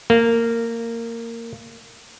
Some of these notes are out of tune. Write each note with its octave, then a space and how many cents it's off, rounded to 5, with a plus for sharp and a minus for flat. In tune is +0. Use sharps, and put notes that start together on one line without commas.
A#3 -15